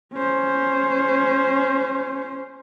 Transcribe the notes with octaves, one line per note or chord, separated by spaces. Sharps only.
C#4 C5